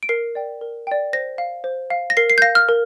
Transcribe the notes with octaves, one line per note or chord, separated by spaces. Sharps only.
D7
A#4 C7
D5 G5
A#4
D5 G5
C5 A#6
F5
C5
F5
A#6
A#4 C7
C7
G6
F5 A#6
F6
A#4